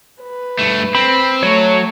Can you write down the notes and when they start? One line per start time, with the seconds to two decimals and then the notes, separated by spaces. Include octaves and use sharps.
0.22 B4
0.59 G2 A3
0.95 C4 B5
1.43 F#3 A3 C#5